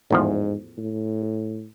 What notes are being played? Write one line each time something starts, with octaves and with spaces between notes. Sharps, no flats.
A1 E2 G#2 F3
A2